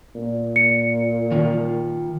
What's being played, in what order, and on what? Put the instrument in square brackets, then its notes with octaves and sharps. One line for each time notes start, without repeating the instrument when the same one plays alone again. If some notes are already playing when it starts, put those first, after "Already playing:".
[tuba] A#2
[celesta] C#7
[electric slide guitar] D#3 F4